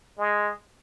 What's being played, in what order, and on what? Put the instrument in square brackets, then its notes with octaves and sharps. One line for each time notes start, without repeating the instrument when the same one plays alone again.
[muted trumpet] G#3